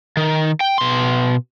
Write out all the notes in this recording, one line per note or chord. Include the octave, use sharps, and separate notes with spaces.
D#3
G5
B2 C6